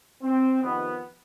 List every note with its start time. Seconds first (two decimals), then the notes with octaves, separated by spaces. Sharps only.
0.23 C4
0.62 F2 C3 D#3 B3